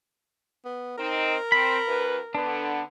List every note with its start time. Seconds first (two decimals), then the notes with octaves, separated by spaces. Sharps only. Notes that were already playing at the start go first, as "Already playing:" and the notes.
0.65 B3
0.98 C4 D#4 A#4
1.52 C4 B5
1.87 D2 B4
2.35 D3 B3 D4